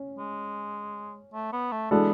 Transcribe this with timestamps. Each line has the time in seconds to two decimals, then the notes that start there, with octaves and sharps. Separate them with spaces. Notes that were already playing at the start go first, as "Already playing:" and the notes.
Already playing: C#4
0.18 G#3
1.33 A3
1.53 B3
1.72 A3
1.91 E3 G#3 B3 D4 F#4 A4